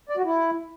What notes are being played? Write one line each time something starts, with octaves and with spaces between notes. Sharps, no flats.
D5
F#4
E4